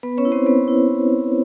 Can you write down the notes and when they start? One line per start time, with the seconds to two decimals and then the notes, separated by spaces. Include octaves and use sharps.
0.03 B3 B4
0.18 C#4 C#5
0.25 E4
0.32 C4 C5
0.46 B3 B4
0.68 E4